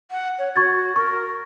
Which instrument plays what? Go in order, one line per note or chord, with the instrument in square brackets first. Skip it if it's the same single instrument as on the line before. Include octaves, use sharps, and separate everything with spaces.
[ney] F#5
C#5
[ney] F#4 [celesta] C#6 G#6 A6
[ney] A#4 [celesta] C#6